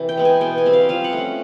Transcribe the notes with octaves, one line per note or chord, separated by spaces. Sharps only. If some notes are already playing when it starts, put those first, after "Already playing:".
Already playing: C3 E3
G5
G#3 B3
G#5
B2 G5
G#5
G3 C4
F5
F3 F5
F#5
A3 C#4